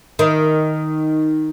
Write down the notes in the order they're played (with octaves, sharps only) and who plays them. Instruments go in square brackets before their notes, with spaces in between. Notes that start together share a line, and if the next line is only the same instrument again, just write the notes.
[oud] D#3